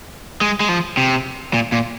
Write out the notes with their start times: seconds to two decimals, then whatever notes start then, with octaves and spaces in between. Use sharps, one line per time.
0.41 G#3
0.60 G#3
0.69 F3
0.97 C3
1.54 A#2
1.72 A#2